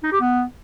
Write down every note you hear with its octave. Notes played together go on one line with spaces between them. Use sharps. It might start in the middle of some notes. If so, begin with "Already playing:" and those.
D#4
G4
B3